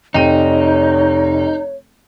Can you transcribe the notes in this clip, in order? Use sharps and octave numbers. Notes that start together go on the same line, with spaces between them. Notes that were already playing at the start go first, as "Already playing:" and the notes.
F1 D#4 C#5 G5 D#7